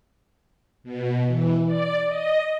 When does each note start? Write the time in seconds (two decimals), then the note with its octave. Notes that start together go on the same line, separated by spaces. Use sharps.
0.84 B2
1.27 E3
1.66 D5
2.08 D#5